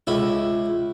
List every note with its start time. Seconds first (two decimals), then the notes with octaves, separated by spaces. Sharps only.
0.07 C#2 E4